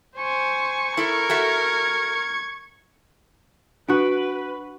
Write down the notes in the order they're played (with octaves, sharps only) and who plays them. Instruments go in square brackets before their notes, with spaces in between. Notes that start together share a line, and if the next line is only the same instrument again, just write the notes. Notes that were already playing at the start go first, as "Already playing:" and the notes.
[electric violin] C5 G#5 [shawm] C#6
[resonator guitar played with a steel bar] E4 A4 [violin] A#4 [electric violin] G#6
[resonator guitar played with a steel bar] F#4 A4 E5
[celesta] D4 [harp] F#4 D7 [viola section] B4